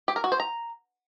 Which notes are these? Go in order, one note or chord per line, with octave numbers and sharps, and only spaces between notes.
G4
A#4
F#4
C5
A#5